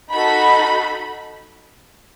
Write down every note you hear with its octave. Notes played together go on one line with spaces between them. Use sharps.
D#4 F#4 A4 B5